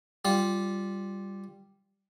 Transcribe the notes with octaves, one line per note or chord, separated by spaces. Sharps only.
G3 F4